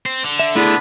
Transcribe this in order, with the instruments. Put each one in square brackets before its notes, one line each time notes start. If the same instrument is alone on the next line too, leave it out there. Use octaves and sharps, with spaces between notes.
[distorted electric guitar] C4
D3
[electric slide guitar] E5
[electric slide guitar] A3 E4 G#4 [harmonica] B3 D4 B4